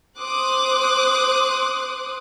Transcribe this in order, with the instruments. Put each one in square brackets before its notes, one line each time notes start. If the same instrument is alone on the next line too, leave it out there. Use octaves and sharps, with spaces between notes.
[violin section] C5 C6 D6 D#6 F#6